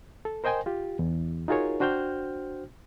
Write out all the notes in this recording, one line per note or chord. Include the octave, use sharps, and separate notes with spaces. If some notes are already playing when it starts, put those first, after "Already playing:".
A4
A#4 C5 D#5 G5 G#5 C6
F4 G4
E2
D#4 F4 F#4 G#4 A#4 C#5
D4 F#4 C5 G5 F6 G6